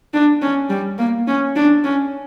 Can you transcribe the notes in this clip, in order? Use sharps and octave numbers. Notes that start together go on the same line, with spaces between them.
D4
C#4
G3
A#3
C#4
D4
C#4